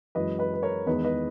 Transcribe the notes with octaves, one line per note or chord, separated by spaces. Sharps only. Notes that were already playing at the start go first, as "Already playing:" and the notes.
F#2 E3 G#3 B4 D#5
B4 D#5
B4
A#4 C#5
E2 D#3 G#3 B4 D#5
B4 D#5